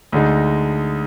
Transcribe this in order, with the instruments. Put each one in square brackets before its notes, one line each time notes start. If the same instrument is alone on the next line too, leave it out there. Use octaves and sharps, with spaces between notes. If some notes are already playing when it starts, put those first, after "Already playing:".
[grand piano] D2 D3 G#3 D#4